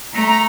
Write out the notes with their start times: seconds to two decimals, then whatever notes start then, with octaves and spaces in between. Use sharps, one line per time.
0.13 A3 A#5
0.28 A#5